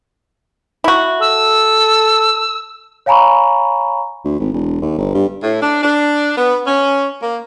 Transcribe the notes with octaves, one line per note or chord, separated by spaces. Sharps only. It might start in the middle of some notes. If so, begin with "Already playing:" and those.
E4 F#4
A4 E6
C#5 F5 G#5 A#5 B5 C#6
D2
G#1
E1
D#2
G1
G2
A2
D4
D4
B3
C#4
A#3